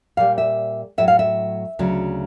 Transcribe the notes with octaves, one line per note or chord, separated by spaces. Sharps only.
A#2 G3 F5
E5
A2 F#3 E5
F5
E5
D2 C#3 F#3